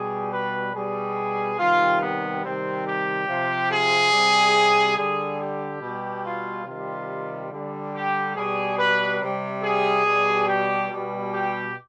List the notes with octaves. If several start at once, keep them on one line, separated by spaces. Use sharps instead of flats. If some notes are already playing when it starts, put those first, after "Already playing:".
Already playing: B2 G3 G#4
B4
B2 G3 G#4
C3 D#3 G3 F4
B3
C3 D#3 G3 C4
G4
C3 F3
G#4
C3 G3
D3 G3 G#4
G4
B2 G3
F4
C3 D#3 G3 F4
D3 G3
G4
B2 G3 G#4
B4
C3 G3
G#4
B2 G3
G4
B2 G3
G4